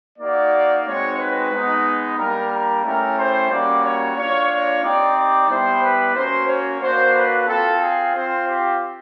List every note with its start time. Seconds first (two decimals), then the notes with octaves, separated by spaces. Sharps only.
0.18 A#3 D#4 F#4 D5
0.85 G#3 C4 D#4 F#4 C#5
1.19 B4
1.51 G#3 B3 D#4
2.18 G3 A#3 D4 A#4
2.50 A#4
2.84 A3 C#4 E4 G4 A#4
3.17 C5
3.49 G3 A#3 C#4 F#4 D5
3.83 C#5
4.16 A#3 D4 F4 C#5
4.50 C#5
4.83 C4 D#4 G4 D5
5.16 D5
5.48 G3 B3 E4 G4 C5
5.81 B4
6.15 A#3 C#4 F#4 C5
6.47 C#5
6.81 A#3 D4 F#4 C5
7.14 B4
7.47 C4 F4 A4
7.81 G#4
8.13 C4 F4 C5
8.47 G4